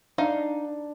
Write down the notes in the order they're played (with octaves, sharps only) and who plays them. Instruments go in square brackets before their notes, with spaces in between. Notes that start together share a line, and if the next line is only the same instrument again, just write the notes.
[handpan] D4 [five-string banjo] D#4 F5